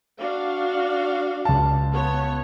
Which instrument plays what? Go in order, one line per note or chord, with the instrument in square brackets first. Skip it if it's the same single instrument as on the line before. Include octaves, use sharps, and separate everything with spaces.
[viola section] D4 F#4 F5
[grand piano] C#2 A5
[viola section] B3 C#5